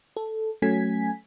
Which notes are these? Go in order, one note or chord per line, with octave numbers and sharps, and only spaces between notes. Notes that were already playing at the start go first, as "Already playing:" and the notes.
A4
F#3 A3 C#4 G#5 G#6 B6